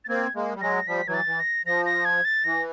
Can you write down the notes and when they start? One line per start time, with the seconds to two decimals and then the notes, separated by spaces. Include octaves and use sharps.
0.05 A6
0.09 A#3 C4 G#6
0.35 G#3 A#3
0.55 G3
0.61 F#3 G#3 A#6
0.87 F3 G3 B6
1.07 E3 F#3 G#6
1.14 A6
1.27 E3
1.40 A#6
1.66 F3 A#6
1.86 A#6
2.05 G#6
2.25 A6
2.44 E3 A#6